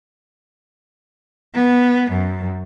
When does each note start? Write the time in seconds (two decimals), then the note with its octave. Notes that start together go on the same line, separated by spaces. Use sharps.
1.55 B3
2.12 F#2